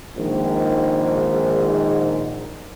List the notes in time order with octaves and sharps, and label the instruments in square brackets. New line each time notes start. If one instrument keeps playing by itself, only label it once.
[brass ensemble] A#1 G#2 D#3